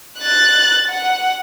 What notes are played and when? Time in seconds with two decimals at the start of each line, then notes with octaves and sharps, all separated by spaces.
0.20 F#6 A6
0.88 F#5